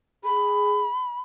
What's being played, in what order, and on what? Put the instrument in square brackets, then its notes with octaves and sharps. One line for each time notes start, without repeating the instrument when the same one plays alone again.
[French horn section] G#4 [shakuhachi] B5